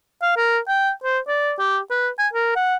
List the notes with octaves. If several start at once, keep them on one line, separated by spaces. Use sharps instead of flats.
F5
A#4
G5
C5
D5
G4
B4
G#5
A#4
F#5